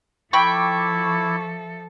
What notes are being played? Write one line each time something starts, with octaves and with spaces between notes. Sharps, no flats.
F3 E4 A4 E5 G5 B5 C#6 D6